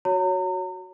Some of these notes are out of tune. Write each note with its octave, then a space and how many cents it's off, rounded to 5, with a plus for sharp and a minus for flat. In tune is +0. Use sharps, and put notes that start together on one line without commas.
F#4 +0 C#5 +0 A#5 -35